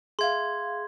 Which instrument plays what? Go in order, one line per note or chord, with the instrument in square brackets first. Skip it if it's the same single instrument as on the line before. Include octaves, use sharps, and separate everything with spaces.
[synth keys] G#4 E5 F5 [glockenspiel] C6 G#6